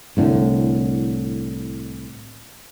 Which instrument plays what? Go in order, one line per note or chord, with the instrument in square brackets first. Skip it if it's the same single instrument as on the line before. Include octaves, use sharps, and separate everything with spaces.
[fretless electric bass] C2 A2 D3